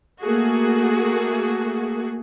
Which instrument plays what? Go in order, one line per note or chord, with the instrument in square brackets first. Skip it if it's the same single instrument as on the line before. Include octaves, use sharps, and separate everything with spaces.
[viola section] A3 A#3 F#4 G#4